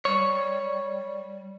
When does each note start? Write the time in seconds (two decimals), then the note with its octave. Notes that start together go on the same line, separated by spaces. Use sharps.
0.05 G3 C#5